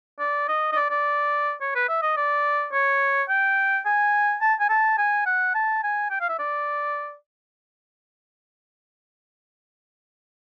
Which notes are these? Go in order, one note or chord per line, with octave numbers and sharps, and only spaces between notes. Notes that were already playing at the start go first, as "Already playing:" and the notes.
D5
D#5
D#5
D5
D5
C#5
B4
E5
D#5
D5
C#5
G5
G#5
A5
G#5
A5
G#5
F#5
A5
G#5
G5
F5
E5
D5